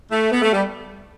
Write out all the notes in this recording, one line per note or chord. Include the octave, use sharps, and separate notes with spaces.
A3
B3
A3
G3